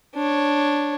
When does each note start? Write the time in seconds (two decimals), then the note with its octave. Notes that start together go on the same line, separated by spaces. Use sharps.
0.15 D4 C#5